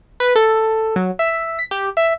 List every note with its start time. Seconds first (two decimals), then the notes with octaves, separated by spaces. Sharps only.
0.20 B4
0.36 A4
0.96 F#3
1.19 E5
1.59 B6
1.71 G4
1.97 E5